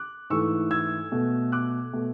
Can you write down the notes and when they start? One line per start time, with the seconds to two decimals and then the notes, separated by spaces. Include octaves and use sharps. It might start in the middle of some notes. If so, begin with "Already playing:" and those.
Already playing: D6 F#6
0.30 G#2 E3 A3 C#6 E6
0.71 E6 G#6
1.12 B2 A3
1.52 D6 F#6
1.93 B2 A3